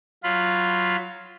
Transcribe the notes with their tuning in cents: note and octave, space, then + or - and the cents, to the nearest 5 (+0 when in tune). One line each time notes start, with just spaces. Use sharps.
F#3 +0 F4 +0 B5 +10